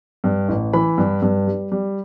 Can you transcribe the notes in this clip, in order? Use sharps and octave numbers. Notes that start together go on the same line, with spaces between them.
G2
A1
E3 B5
G2
G2
G3
G3